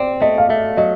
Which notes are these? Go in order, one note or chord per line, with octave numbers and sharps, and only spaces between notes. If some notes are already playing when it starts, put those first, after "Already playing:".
Already playing: C4 D5
A3 D#5
F5
A3 E5
F#3 D#5